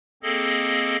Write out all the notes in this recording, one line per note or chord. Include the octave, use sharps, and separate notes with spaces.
A#3 C4 G#4 A4 D#5